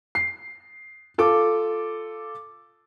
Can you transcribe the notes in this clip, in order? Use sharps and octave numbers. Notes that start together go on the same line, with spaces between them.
C7
F4 A4 D6